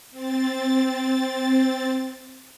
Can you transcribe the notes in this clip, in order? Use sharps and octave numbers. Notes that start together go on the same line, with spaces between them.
C4 A6